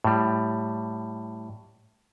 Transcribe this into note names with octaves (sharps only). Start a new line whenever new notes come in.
A2 G3